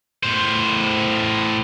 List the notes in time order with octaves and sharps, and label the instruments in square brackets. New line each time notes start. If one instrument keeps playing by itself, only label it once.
[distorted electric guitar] A2 C5